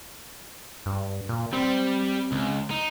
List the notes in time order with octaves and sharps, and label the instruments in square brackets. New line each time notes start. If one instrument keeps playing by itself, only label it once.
[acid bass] G2
A#2
[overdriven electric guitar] G3 [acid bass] C4
[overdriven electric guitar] C#2
D#4